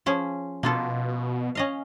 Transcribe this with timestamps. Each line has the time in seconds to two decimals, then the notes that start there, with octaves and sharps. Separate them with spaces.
0.06 F3 C#4 G#4
0.63 B2 A#3 F4 A4
1.55 C#4 D#5 F5